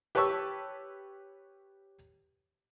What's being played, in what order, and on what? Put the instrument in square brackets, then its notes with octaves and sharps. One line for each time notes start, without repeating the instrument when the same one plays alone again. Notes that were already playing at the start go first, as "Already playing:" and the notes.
[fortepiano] G4 B4 C#5 A5 C#6 E6